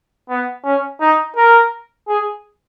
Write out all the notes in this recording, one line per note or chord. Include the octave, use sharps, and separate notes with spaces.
B3
C#4
D#4
A#4
G#4